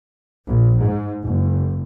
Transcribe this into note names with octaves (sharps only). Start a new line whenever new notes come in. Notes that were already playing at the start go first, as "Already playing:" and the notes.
A#1
G#2
F#1